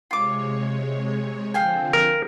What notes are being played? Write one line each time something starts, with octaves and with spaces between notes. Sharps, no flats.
C3 G#3 F4 C#5 D6
D3 F3 C4 F5 G5 G#5
A#4